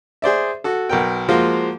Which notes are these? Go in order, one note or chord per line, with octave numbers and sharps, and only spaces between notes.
G#4 C5 D5 E5
F#4 A4
B1 A#4 G5
F3 G#3 A#3 F4 F#4